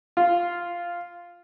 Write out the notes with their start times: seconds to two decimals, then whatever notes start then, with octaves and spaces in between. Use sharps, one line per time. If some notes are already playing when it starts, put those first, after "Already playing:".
0.17 F4